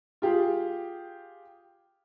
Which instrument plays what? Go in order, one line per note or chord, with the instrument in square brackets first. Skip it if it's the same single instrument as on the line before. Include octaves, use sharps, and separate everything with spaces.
[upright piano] F4 G4 G#4